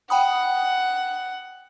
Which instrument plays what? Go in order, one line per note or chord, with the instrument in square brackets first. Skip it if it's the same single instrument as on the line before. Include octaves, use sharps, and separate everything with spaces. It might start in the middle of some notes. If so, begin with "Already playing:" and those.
[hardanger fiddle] F#5 [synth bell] G5 B5 D#6